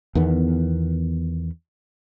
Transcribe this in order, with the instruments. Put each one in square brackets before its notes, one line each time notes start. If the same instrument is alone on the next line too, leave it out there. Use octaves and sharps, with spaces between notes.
[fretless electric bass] E2 D#3 B3